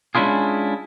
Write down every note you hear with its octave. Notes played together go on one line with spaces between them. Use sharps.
G#3 C#4 D4 E4 F4 G#4